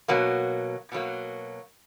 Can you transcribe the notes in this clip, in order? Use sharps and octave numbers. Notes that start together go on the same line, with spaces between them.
B2 F#3 A#3
B2 F#3 A#3